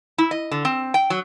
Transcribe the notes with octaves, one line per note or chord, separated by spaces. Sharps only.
E4
D#5
D3
C4
G5
F#3